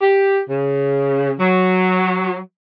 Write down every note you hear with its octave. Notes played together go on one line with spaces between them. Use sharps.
G4
C#3
F#3